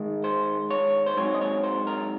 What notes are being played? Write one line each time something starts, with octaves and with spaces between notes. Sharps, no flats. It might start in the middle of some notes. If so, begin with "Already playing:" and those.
Already playing: G#2 D#3 G#3
C5
C#5
C5
G#2 F#3 C4 C#5
D#5
C#5
C5
A#4